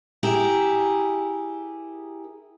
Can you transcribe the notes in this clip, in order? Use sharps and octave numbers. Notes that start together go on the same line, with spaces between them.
E4 G4 G#4 A#4